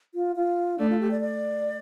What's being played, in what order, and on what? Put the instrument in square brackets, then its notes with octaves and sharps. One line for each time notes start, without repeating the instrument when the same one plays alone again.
[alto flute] F4
F4
[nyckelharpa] A3 [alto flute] D4
[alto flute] F4
G4
D5
D5